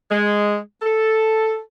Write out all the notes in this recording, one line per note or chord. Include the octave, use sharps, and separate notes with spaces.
G#3
A4